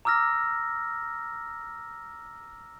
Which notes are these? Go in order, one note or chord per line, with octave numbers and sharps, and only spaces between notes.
A#5 D6 E6 F6 A#6